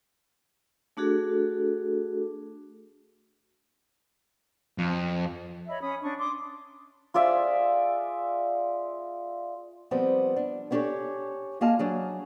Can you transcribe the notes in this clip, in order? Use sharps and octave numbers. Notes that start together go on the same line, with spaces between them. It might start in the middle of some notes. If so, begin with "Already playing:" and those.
A3 D4 F#4 G#4 A4
F2
C#5 D#5 E5 B5
C#4 B5 D#6
C#4 D4 C#6
C6 D6 D#6
F4 G#4 D5 E5
F3 G3 B3 C4
D4
B3 C#4 D4 G4 A4 C#5
A#3 F4 G#4 D#5 F5 A5
F#3 D4 G#4